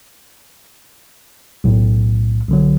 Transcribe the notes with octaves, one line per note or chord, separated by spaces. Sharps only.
B1 A2
B1 D3 F#3